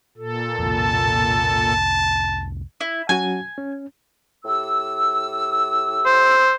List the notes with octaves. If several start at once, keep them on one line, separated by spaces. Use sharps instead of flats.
A#2 A4
C2 F2 A5
E4
F#3 C#4 F#4 G#5
C#4
A2 G4 E6
C5